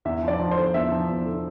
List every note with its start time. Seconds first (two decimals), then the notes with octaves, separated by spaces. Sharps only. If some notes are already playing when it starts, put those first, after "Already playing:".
0.05 E2 E5
0.23 F3 D5
0.39 F3
0.51 C5
0.57 D3
0.74 E2 E5
0.92 F3
1.09 E2
1.26 D3